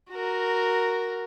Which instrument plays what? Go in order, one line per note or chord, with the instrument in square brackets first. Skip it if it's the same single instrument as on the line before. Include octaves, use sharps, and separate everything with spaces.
[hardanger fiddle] F#4 A#4